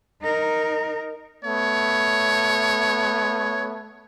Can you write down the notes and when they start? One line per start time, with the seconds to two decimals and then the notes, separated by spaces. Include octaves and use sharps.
0.22 D#4 A#4
1.44 A3 B3 C#5